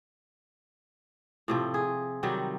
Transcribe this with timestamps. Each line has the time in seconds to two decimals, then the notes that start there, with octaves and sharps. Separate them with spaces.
1.48 A2 C3 F3
1.74 G#4
2.23 C3 D#3 F#3 G3